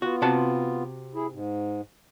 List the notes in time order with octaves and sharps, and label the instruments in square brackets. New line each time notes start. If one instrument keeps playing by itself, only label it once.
[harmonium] B3 F4 [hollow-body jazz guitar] F#4
[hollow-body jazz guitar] C3 F#4 A5
[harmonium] E4 G#4
G#2